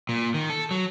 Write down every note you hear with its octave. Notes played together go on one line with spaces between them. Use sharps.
A#2
D#3
A4
F#3